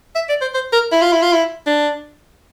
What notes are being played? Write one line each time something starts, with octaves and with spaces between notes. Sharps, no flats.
E5
D5
C5
C5
A#4
E4
F4
E4
F4
E4
D4